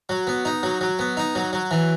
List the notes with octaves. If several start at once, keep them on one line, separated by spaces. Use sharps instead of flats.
F#3
B3
D#4
F#3
F#3
B3
D#4
F#3
F#3
E3